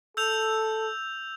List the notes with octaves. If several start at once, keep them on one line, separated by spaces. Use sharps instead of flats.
A4 E6 G6 F7